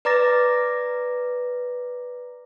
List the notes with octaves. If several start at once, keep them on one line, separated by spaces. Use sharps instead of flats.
B4 D5 A#5 D6 A6 A#6